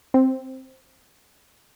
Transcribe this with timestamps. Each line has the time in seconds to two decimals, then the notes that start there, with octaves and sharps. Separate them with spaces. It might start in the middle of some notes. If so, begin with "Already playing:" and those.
0.14 C4